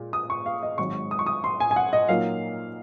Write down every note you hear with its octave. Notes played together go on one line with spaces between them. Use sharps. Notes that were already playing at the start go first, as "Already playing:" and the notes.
Already playing: A#2 G#3
D#6
C#6
F5
D#5
G#1 G#2 F#3 C#6
D#6
C#6
D#6
C6
G#5
G#5
F#5
D#5
A#2 F#3 A#3 D#4 F5